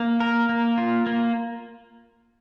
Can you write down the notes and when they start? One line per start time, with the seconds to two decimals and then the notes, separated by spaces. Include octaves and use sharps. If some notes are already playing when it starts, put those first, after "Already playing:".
Already playing: A#3
0.20 A#4
0.49 A#3
0.78 F4
1.07 A#3